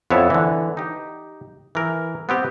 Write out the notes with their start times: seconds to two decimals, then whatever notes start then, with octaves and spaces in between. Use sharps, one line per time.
0.10 F2 B3 E4 C#5 E5 A5
0.30 D3 E3
0.77 D#4 G4
1.75 E3 A#4
2.29 B3 C4 G4